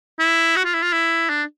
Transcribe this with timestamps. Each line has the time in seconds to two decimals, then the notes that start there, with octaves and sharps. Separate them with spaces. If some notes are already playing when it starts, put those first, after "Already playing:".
0.19 E4
0.56 F#4
0.64 F4
0.74 E4
0.82 F4
0.92 E4
1.29 D4